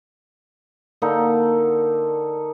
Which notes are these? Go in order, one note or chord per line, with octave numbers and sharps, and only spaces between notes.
D3 A#3 D#4 A4